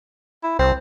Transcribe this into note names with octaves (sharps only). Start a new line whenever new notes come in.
E4
C2 C4